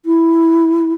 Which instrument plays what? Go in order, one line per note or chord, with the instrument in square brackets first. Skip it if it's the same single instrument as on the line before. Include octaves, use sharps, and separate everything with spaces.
[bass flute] E4